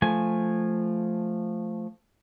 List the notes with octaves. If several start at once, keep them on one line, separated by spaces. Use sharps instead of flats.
F3 A3 G#5